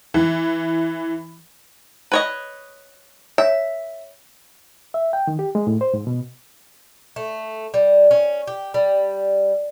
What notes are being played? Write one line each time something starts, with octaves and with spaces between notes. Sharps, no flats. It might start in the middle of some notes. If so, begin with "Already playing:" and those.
E3
B4 C#5 D#5
C#5 E5
E5
G5
D#3
G4
G#3
A2
C5
G#2
B2
A3
G3
C#4
G4
G3